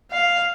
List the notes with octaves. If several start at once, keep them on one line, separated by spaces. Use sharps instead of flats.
F5